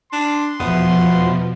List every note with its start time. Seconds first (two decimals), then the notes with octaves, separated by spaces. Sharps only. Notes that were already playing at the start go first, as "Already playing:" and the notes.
0.12 D4 C6
0.60 F1 E2 B2 F3 B3